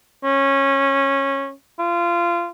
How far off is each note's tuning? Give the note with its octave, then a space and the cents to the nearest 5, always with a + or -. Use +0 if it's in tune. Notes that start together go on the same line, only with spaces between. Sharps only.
C#4 -15
F4 -25